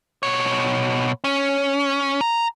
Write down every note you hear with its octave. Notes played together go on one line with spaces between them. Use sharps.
B2 C#5
C#4
A#5